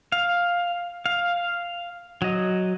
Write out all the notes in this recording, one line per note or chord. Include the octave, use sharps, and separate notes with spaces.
F5
F5
F#3 D#5